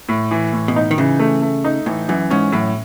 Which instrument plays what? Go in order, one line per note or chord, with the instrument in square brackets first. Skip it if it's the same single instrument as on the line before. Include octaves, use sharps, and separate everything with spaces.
[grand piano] A2
E3
A2
[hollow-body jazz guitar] B2
[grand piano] D#4
[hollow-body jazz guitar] D#3
[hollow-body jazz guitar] C#3 [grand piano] E3
[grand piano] A3
A3
D#4
[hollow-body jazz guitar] A2 [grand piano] E3
[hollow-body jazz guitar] F#2 [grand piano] E3
[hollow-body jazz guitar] G#2 [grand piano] C#4
[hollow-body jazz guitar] F#2 [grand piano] A2